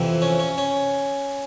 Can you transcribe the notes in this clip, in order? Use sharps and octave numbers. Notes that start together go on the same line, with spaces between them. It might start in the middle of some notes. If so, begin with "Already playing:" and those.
Already playing: F2 C3 E3
C#4
C#4
C#4